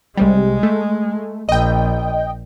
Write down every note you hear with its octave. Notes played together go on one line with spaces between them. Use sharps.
C2 C3 G3 G#3
A3
A#1 D#5 G5